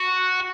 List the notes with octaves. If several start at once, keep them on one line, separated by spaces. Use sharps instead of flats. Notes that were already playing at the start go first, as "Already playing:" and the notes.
Already playing: F#4